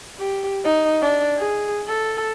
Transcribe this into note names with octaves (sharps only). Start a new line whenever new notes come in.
G4
D#4
D4
G#4
A4